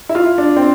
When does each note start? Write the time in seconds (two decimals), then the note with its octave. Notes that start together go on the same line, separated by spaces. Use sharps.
0.09 E4
0.15 F4
0.38 D4
0.56 C4